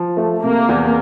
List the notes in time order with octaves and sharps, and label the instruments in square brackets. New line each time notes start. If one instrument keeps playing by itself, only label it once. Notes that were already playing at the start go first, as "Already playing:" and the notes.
Already playing: [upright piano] F3
A3
[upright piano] C3 [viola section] A#3
[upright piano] E2